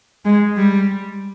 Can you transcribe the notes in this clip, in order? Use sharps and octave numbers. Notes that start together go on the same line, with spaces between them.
G#3
G3